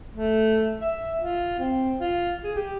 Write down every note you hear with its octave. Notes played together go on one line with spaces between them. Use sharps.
A3
E5
F4
C4
F4
G#4
G4